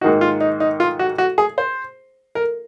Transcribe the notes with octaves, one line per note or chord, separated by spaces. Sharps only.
G#2 D#3 A#3 D#4 F#4
F4
D#4
D#4
F4
F#4
F#4
G#4
C5
A#4